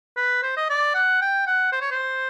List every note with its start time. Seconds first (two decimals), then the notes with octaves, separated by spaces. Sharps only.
0.17 B4
0.43 C5
0.57 D#5
0.70 D5
0.94 F#5
1.22 G5
1.47 F#5
1.72 C5
1.81 C#5
1.91 C5